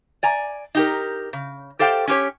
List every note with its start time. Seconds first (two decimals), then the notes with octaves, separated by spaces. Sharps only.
0.23 D5 G#5 A#5
0.75 D#4 G4 A#4
1.33 C#3
1.79 G4 A4 C5 F5 G5
2.08 C#4 G4 C#5